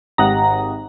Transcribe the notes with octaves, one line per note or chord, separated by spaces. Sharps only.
G#1 G4 F#5 A#5 D#6